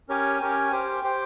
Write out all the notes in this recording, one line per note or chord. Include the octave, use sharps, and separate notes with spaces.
C#4 G4 A#4 C#5 G#5
C#4 G4 A#4 C#5 G#5
G4 C5 G5
G4 C5 G5